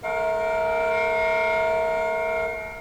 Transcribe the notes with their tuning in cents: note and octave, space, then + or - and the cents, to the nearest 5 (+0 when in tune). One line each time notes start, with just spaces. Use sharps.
A3 -30 A#4 +0 F5 +40